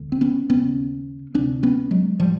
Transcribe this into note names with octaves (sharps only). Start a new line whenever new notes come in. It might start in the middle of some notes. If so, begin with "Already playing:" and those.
Already playing: E1 D2 D3
C4
B3 C#4
E1 D#2 C#3 B3 C#4
D2 C3 C4 D4
B3 C#4
F#3 G#3
A2 F3 G3